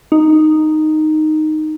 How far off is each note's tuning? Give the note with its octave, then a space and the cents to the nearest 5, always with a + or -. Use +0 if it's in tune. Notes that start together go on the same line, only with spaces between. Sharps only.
D#4 -5